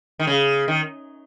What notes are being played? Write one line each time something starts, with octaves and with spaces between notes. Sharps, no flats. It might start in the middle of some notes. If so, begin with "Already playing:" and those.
D#3
C#3
D#3